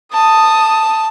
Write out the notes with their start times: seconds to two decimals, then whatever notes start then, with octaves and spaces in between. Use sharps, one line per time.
0.13 A5 D#6